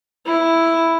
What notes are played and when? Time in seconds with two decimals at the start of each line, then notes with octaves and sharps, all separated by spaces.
0.26 E4